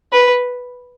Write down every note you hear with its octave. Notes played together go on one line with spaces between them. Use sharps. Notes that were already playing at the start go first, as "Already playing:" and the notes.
B4